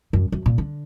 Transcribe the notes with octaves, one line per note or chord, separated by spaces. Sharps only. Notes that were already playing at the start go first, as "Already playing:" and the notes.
F#2
F#2
A#2
D3